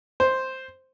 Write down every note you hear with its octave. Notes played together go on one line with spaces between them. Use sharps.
C5